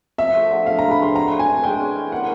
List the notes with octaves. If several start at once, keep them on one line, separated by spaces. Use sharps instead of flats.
F3 E5
A3
D3
F3 F5
A#5
G#3
B5
C4 C6
F#3 A#5
A3
G#5
D4
G#3 G5
C#4
E3
A#3 F#5